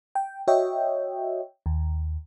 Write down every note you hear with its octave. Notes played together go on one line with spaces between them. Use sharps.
G5
F#4 C#5 D#5 E5 G5
D#2